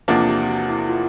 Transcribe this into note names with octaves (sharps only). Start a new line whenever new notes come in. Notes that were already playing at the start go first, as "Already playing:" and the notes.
E2 C3 F3 A#3 D4 F4
G4
F#4
E4
F4